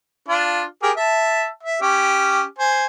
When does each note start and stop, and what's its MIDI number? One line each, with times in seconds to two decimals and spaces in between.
0.28 0.63 62
0.28 0.63 65
0.83 0.91 67
0.83 0.91 68
0.83 0.91 70
0.97 1.47 76
0.97 1.47 81
1.63 1.81 76
1.82 2.44 61
1.82 2.44 67
2.59 2.86 72
2.59 2.86 80